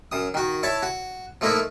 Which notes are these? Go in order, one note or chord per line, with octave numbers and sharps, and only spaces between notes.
F#2 D#6
D#3 F#4
E4 C#5 A5
F#4
F3 A3 A#3 D#4 E4